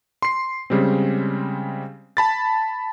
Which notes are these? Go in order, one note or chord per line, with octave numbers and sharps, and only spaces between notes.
C6 C7
C#3 G3 G#3 C4
A5 B5 A6